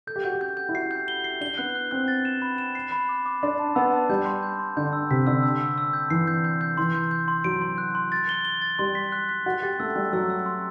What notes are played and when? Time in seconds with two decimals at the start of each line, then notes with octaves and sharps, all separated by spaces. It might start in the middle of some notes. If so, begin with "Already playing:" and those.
0.07 A4 G6
0.16 G4
0.24 F#4 G6
0.33 G4
0.41 G6
0.57 G6
0.69 E4
0.74 F#4 C7
0.91 G6
1.08 G7
1.24 C7
1.41 D4 G7
1.58 B3 F#6
1.75 F#6
1.91 C4 F#6
2.08 A6
2.25 E7
2.42 B5
2.58 E7
2.75 C7
2.92 B5
3.09 D6
3.26 D6
3.42 D4 C6
3.59 A5
3.75 B3 E6
3.93 A5
4.09 G3 G6
4.26 C6
4.43 G6
4.59 C6
4.77 D3 G6
4.93 E6
5.11 C3 B6
5.27 D3 E6
5.43 E6
5.61 E6
5.78 E6
5.93 G6
6.10 E3 C7
6.28 G6
6.44 G6
6.61 G6
6.78 E3 C6
6.95 G6
7.11 G6
7.28 C6
7.44 F#3 D7
7.61 C6
7.78 F#6
7.95 C6
8.12 A6
8.29 G7
8.45 G7
8.62 A6
8.79 G3 C6
8.95 B6
9.12 F#6
9.29 B6
9.46 F#4 A6
9.62 G4 A6
9.80 A3 E6
9.96 G3 E6
10.13 F#3 E6
10.30 E6
10.46 C6